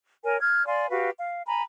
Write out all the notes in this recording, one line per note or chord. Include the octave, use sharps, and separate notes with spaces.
A#4 C#5 G#5
F6 F#6 G#6
D5 F5 G#5 C6
F#4 G4 B4 F5
F5
G#5 A#5 B5